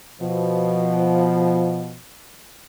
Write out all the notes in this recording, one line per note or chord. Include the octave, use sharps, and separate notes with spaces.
B2 F3